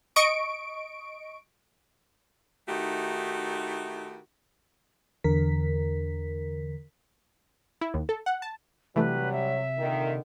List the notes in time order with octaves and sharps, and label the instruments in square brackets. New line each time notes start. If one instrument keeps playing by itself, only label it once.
[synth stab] D#5 C#6 D7
[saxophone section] D#3 A3 D#4 E4 F#4 G4
[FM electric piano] E2 D3 A#4 B6
[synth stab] E4
D#2
A4
F#5
A5
[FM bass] C3 [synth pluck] E3 A3 [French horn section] F#3 G3 [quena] B4
[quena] E5
[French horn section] A#2 D3 D#3